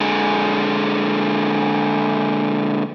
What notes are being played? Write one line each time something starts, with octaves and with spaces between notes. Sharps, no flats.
D3 G#3